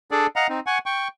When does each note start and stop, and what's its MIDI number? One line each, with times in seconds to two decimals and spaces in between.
0.11 0.27 62
0.11 0.27 68
0.11 0.27 69
0.11 0.27 74
0.36 0.47 75
0.36 0.47 77
0.36 0.47 78
0.36 0.47 82
0.49 0.60 60
0.49 0.60 63
0.67 0.78 78
0.67 0.78 80
0.67 0.78 85
0.86 1.08 79
0.86 1.08 85